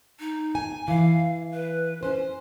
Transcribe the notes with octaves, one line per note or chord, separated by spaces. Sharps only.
D#4
G#5
E3 F5
B4
C#4 C5